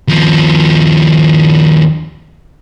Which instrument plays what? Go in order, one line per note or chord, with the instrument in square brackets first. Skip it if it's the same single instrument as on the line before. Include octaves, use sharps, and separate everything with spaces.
[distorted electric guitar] D#2 F3